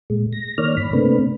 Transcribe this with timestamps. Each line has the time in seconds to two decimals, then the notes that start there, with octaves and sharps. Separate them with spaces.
0.10 A#2 G#3
0.33 A#6
0.58 D#3 A#3 C#5 D5 F6
0.77 G2 B5
0.93 C3 A3 A#3 C4 D4 B4